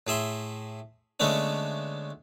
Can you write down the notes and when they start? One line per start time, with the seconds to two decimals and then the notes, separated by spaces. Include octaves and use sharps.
0.07 A2 G#4 E5 C6
1.20 D3 G#3 A3 B3 C#4 D4